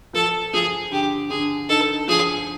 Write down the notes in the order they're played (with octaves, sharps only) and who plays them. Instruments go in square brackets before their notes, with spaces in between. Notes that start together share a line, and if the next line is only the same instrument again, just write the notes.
[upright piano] F3 [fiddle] A4
[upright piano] F3 [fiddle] G#4
[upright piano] D3 [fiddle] G4
[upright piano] D3 [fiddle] G#4
[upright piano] D#4 [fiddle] A4
[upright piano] F3 [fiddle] G#4